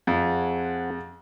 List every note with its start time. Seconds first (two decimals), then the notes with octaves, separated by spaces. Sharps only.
0.07 F2 C4 G#4 F#5